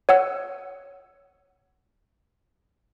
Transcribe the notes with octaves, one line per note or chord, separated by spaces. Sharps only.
C#5 F#5 E6